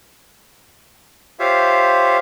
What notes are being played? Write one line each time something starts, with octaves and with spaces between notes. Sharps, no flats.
F4 G4 C5 C#5 E5 F5